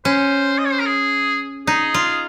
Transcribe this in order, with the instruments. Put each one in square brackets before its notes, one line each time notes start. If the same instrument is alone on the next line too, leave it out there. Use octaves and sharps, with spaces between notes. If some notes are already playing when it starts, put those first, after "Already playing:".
[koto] C#4 [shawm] C5
[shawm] D#5
C#5
C5
A#4
G#4
[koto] D#4 [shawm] G#4
[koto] F4